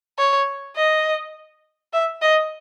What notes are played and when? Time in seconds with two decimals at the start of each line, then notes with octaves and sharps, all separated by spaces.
0.18 C#5
0.76 D#5
1.93 E5
2.22 D#5